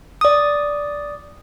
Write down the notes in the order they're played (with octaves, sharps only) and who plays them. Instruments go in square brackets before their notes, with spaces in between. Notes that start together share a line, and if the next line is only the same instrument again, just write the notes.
[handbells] D5 D#6